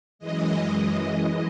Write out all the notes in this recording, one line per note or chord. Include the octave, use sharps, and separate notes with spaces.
F#2 E3 G#3 D#5